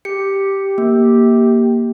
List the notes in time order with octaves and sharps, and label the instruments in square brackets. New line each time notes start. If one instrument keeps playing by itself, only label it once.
[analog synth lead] G4 [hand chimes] C#7
[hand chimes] A#3